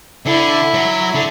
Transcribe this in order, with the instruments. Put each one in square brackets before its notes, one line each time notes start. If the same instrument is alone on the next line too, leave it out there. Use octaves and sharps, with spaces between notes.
[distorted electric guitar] D3 [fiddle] E4
[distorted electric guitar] F#3
D3